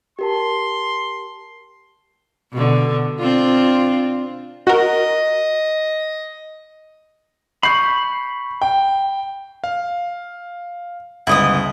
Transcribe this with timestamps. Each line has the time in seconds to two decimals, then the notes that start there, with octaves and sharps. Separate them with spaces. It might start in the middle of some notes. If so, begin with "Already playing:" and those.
0.19 G4 A#4 A5 C6
2.52 B2 D3
3.19 C4 D4 F4
4.67 F#4 A#4 D#5
7.63 B5 C#6 G6 C7
8.61 G5
9.64 F5
11.27 G1 C#2 E4 D#5 D#6